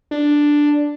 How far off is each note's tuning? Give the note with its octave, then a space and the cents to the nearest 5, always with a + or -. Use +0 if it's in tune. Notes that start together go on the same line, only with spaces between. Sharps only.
D4 +0